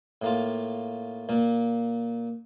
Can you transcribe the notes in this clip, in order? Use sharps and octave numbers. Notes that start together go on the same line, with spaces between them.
A2 A#3 F4
A#2 A#3